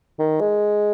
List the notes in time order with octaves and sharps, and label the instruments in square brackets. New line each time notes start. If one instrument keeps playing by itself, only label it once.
[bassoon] D#3
G#3